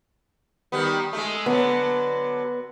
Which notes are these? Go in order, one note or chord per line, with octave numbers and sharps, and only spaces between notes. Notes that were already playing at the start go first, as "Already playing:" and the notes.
D#3 G3 B3
G#3 A3
D3 F#3 B3